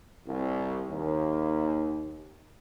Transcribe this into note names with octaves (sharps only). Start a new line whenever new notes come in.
C2
D#2